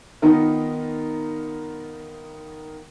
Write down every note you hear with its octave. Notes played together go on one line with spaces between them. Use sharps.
D#3 B3 D#4 F4 A#4